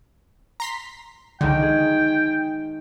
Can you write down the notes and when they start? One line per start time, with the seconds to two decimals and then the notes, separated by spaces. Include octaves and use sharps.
0.60 A#5 C6 B6
1.41 C#2 D3 D#3 G#3 G5
1.63 G#4